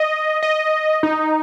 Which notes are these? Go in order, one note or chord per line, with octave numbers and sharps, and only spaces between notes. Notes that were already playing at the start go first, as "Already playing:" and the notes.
Already playing: D#5
D#5
D#4